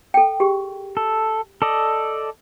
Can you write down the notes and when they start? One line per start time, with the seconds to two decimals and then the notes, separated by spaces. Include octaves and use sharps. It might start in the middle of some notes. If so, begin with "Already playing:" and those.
0.14 A4 G5
0.40 G4 G#4
0.97 A4
1.62 A4 D5 D#5